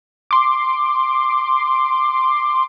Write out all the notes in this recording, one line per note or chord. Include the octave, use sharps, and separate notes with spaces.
C6 D6